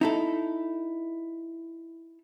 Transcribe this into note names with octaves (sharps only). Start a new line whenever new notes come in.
D#4 E4 A4